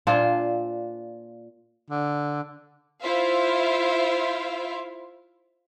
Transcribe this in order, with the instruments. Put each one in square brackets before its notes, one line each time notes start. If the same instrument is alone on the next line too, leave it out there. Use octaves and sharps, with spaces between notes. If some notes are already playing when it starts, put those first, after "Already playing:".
[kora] A#2 D4 F4 C5
[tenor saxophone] D3
[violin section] E4 F4 C5 E5 F5